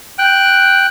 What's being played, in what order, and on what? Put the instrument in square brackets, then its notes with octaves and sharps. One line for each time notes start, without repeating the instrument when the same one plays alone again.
[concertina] G5 F#6